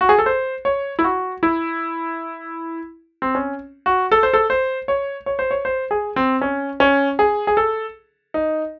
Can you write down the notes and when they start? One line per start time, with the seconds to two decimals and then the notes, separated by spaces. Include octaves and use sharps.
0.01 F#4
0.09 G#4
0.18 A4
0.26 C5
0.65 C#5
0.99 E4
1.04 F#4
1.43 E4
3.22 C4
3.35 C#4
3.86 F#4
4.11 A4
4.23 C5
4.33 A4
4.50 C5
4.88 C#5
5.26 C#5
5.39 C5
5.51 C#5
5.65 C5
5.91 G#4
6.16 C4
6.41 C#4
6.80 C#4
7.19 G#4
7.47 G#4
7.57 A4
8.34 D#4